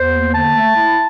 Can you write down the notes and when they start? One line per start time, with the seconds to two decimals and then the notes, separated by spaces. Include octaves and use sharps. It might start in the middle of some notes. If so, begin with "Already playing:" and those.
Already playing: E2 C5
0.13 A#3
0.33 D3 A5
0.55 A3
0.75 E4